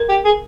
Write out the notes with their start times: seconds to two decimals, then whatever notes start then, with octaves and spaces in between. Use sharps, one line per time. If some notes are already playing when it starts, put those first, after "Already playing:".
Already playing: A#4
0.09 G4
0.25 G#4